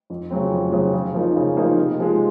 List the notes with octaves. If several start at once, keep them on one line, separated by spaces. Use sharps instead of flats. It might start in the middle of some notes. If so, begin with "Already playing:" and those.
F2
C#3 F#3 C4
F2
C#3 F#3 C4
C#3
F3 A#3 D#4
C#3
F3 A#3 D#4
C3
F3 G#3